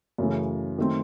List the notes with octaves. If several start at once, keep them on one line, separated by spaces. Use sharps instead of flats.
F#2 C#3 E3 A3
D#3 F#3 A3 C4